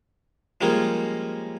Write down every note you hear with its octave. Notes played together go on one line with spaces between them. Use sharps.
F3 G3 G#3 A#3 C#4 F4